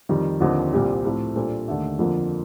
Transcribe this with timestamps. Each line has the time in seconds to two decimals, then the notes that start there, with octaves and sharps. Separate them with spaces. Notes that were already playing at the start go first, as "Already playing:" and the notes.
0.09 F2 D#3 G3
0.40 D#2 D3 F3 C4
0.73 C2 A#2 G3 C4 G4
1.04 A2 F3 A3 C4 G4
1.35 A#2 G3 D4 A4 C5
1.68 D#2 D3 A3
1.99 F2 D3 F3 A#3